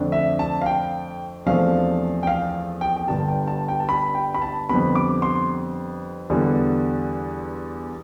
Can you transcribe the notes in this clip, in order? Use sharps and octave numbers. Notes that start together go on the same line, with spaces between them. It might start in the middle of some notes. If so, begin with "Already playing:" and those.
Already playing: F2 D3 A3 D4
E5
A5
F5
G5
E2 C3 F3 A3 D4 F5
G5
F5
G5
G5
G1 G2 D3 G3 A5
G5
A5
G5
A5
B5
G5
B5
A5
F2 D3 G3 B3 B5
D6
C6
E2 D3 G3 B3